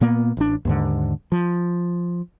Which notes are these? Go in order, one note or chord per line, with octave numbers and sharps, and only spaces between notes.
A#2 A#3 B3
A1 D4
D#2 G#2 D3
F3